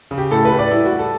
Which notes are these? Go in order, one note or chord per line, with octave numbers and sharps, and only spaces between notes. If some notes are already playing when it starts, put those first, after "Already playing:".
C#3
G4
A2 A4
B4
A2
D5
G3 E4
F#4
G3
A4